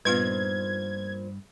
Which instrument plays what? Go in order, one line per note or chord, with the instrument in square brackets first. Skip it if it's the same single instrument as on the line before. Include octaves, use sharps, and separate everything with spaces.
[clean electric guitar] G2 [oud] A#2 F3 D#4 [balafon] B3 F4 B4 [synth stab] G#6